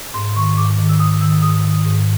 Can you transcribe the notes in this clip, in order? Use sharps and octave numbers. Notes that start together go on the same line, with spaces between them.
G#2 C6
D#3 C#6
G#2 D6
D#3
E6
G#2 D#6
D#3 E6
G#2 D#6
D#3
G#2